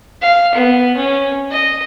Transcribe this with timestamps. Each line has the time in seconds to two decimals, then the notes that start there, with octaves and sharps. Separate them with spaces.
0.22 F5
0.54 B3
0.97 C#4
1.51 D#5